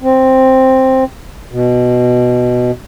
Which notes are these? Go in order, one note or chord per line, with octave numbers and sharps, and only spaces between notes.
C4
B2